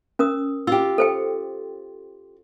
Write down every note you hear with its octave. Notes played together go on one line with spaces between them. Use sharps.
C#4 A#4 D#6
F4 G4 E6
A4 C5 G5